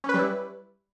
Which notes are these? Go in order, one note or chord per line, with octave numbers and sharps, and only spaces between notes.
G3 C#4 E4 B4